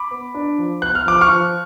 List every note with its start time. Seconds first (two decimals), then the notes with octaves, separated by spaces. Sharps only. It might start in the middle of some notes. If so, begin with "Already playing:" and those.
Already playing: B5 D6
0.11 B3
0.35 D4
0.58 F3
0.81 B3 F#6
0.95 F6
1.06 F3 D6
1.21 C#6 F6
1.29 F3